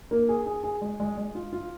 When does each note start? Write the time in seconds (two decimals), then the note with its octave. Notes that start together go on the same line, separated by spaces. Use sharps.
0.11 A#3
0.29 G#4
0.46 G#4
0.63 G#4
0.82 G#3
1.00 G#3
1.17 G#3
1.35 F4
1.53 F4